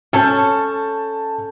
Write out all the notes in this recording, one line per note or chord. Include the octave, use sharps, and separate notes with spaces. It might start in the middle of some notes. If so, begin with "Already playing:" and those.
C#4 A4 G#5 A5 G6